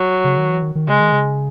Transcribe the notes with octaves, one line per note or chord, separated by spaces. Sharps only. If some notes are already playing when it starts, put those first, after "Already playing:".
Already playing: F#3
C#3
D#3
E3
D#3
D#3
C#3 G#3
D#3
C#3